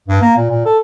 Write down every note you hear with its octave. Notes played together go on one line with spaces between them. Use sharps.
G2
A#3
A#2
A#2
A4